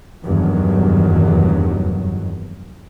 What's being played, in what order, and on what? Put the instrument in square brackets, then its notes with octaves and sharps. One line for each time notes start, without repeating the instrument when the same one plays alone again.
[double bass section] F1 E2 G2 D#3 F#3